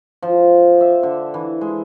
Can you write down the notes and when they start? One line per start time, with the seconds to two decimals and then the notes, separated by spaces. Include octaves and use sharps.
0.22 F3
0.81 E5
1.03 D3
1.34 E3
1.61 G#3